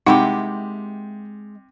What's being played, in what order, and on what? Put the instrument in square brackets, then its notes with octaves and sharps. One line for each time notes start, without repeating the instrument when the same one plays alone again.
[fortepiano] C3 [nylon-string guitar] G#3 F#5 G5 [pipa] A#3 E4 G4 [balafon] D#4